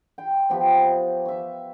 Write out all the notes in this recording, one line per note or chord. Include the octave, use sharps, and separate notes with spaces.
G5 C6
F3 B3 G4
E5 C#6